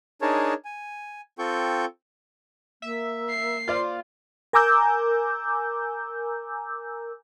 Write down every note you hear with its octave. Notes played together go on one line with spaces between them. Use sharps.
D4 D#4 G#4 A#4 C#5 A5
G#5
C4 F4 A4 G5 C#6 G6
A#3 E5
C7
F4 C5 D5 F5
A#4 G#5 A#5 D6 E6 G6